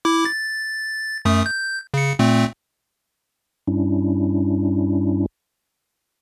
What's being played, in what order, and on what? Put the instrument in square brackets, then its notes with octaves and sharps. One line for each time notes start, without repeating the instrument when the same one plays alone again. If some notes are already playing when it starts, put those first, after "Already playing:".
[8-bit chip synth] E4 D6
A6
F#2 A3 D#6
G6
C#3 C#7
A#2 A3 C4
[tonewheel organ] G2 G3 C#4 D4 E4